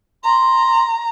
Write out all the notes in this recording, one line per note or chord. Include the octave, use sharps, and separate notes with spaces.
A#5 C6